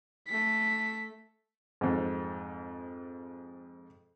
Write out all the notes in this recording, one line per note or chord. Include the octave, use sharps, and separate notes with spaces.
A3 B6
F2 G#2